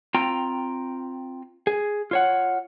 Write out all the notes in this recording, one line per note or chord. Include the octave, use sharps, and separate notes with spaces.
C4 F4 G5 A#5
G#4
F4 C#5 F#5